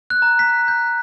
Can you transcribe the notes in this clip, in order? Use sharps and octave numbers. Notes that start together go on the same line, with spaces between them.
F#6
A#5
B6
G6